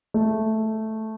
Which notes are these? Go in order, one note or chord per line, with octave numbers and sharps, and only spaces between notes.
A3